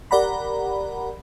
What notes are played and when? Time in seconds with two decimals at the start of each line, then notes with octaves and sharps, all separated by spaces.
0.11 G4 A#4 D5 F#5 A#5 B5